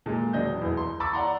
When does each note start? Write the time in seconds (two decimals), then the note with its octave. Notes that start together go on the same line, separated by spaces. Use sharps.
0.06 A#2 G#3
0.33 E1 F#3 D4 D#5 G6
0.61 E2 B4
0.77 C6
1.00 B5 C#6 D6 E6 A6
1.13 D5 F#5 A#5 C6